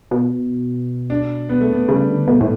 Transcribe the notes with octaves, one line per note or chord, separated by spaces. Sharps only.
B2
D4
B3
A3
B3
C#3 G3
D3
B2 A3
A2